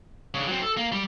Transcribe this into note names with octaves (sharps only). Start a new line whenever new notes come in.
C#3 D4
F#3 C4
A4
A#3
G3